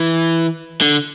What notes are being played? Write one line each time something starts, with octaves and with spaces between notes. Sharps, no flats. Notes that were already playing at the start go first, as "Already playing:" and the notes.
Already playing: E3
D3